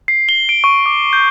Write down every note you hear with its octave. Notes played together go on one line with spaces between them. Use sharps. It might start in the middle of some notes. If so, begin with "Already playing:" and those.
C7
G7
D7
C#6
D6
G6